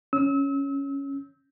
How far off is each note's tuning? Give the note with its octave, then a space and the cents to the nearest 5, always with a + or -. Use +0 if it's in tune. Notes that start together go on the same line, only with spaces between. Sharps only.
C#4 +0 E6 -35